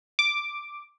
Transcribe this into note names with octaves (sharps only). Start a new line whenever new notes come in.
D6